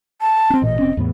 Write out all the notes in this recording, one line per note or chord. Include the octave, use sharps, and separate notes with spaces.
A5
C4 C#4
A1 A#2 D#5
F1 C4 C#4
E2 A2 B3